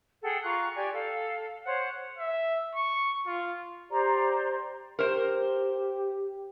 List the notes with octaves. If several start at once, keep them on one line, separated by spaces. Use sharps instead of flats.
G#4 A4 F#5 G5
F4 A#5 C#6 F#6
G4 D5 G#5
A4 F5
C5 C#5 F#5
E5
C#6
F4
G4 C5 D5 A#5
G4 A#4 C5